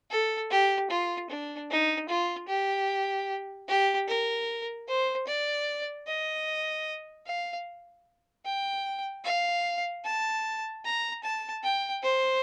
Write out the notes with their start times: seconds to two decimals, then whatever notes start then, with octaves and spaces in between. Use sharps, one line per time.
0.10 A4
0.50 G4
0.90 F4
1.30 D4
1.70 D#4
2.09 F4
2.48 G4
3.68 G4
4.08 A#4
4.88 C5
5.27 D5
6.07 D#5
7.26 F5
8.45 G5
9.25 F5
10.05 A5
10.85 A#5
11.23 A5
11.63 G5
12.03 C5